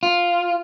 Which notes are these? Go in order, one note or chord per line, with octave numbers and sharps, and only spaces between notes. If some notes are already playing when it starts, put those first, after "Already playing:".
F4